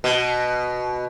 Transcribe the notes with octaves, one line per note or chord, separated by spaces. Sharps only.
B2